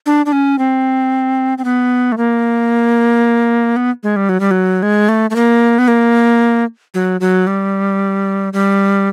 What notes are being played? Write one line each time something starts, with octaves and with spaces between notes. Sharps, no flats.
D4
D4
C#4
C4
C4
B3
A3
A#3
B3
G#3
G3
F#3
G3
F#3
G#3
A3
A3
A#3
B3
A#3
F#3
F#3
G3
G3